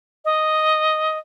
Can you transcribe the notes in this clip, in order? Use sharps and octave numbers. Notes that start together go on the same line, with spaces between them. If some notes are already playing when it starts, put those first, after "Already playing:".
D#5